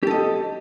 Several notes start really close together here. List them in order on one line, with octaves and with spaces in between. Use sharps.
G4 A4 D#5